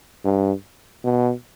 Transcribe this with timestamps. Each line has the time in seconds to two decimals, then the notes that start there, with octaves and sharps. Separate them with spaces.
0.24 G2
1.04 B2